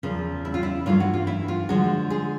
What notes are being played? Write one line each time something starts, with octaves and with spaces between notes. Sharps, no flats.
E2 C#3 F3
E4
F4
E4
G2 E3 A3 F4
F#4
F4
E4
F4
D3 F3 G#3 F#4
G#4